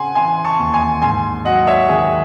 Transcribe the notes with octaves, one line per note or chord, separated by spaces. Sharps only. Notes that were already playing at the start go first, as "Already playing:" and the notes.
Already playing: C#3 C4 F#5 G#5 C6
E3 G#5 C6
A5 C#6
D#2
G#5 C6
G#2 G#5 C6
F#3 D#5 F#5
C#5 E5
D#3 G#4